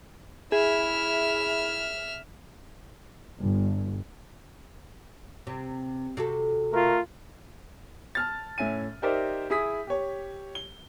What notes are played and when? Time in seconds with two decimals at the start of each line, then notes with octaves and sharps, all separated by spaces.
0.52 E4 G#4 E5 F6
3.42 G1
5.47 C3
6.17 C3 F#4 A4
6.73 A3 F4 A#4
8.15 A5 F6 A6
8.58 A2 C#4 E5 G#5 D#7
9.02 D#4 G4 A#4 C5 D5 E5
9.50 E4 G#4 D#6 B6
9.87 G4 C#5
10.55 G7